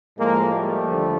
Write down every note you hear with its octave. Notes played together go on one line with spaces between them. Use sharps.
A2 F3 G#3 A#3
G3 A3
D#2 D3 F3